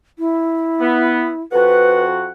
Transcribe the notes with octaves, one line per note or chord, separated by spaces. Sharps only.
E4
B3
F2 F#4 B4 F#5